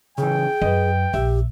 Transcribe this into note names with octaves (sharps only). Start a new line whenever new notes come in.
C#3 E3 G#4 G5
F#2 B4 D#5
A#1 G4 E5